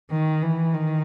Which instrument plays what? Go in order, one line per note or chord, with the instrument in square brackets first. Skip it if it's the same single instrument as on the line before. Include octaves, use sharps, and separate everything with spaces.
[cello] D#3
E3
D#3